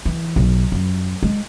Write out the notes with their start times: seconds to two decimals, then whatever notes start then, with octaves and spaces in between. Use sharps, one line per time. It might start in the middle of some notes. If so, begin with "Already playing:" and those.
0.06 E3
0.36 B1
0.72 F#2
1.23 G#3